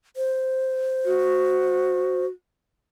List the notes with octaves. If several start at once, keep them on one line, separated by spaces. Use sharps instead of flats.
C5
F#4